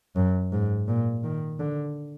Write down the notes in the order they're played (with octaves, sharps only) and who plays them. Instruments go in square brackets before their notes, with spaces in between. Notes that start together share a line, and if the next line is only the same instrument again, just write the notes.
[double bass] F#2
G#2
A#2
D#3
D3